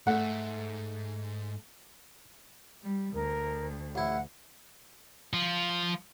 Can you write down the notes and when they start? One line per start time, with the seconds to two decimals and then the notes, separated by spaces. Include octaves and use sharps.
0.07 G#2 A3 E5 F#5
2.83 G3
3.14 D2 A#4
3.95 A1 E4 F#5
5.33 F3 F4